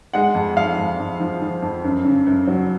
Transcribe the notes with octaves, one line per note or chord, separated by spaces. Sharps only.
G#3 F#5
F2
F2 F5
F2
F2
F3
F3
F2
F#2
C#3
F#2
F#3